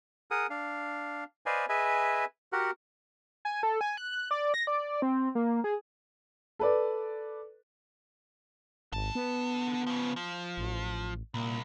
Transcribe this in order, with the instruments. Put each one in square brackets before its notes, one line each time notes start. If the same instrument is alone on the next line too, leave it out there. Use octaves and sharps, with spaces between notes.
[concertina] G#4 A#4 F#5 D#6
D4 F5
B4 C5 D5 D#5 F5 G#5
G#4 B4 D#5 E5 G#5
F#4 G4 A#4 F#5
[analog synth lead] G#5
A4
G#5
F#6
D5
A#6
D5
C4
A#3
G#4
[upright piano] A4 B4 D5
[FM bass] G#1 [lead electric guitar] D3 A5
[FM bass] B3
[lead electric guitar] C#3 F3
F3
[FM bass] A1
[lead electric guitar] C2 [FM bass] A#2